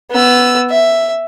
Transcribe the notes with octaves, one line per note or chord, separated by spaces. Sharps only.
B3 E6
E5